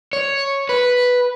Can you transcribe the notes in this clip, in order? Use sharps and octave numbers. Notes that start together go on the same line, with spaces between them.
C#5
B4